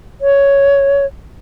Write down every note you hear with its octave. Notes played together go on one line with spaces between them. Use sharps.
C#5